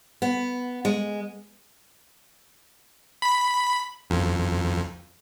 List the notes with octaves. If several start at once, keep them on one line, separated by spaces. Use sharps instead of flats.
B3
G#3
B5
F2